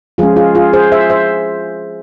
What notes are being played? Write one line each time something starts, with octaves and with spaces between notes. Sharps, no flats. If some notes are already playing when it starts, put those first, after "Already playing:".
F3 G#3 C#4 F4 G#4
F4 G#4
F4 G#4
G#4 C5
C5 E5
C5 E5